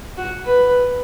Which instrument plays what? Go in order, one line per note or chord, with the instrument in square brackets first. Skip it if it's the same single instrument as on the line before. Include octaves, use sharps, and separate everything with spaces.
[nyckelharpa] F#4
B4